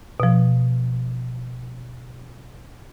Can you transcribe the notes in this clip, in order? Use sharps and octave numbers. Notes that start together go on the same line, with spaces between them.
B2 F3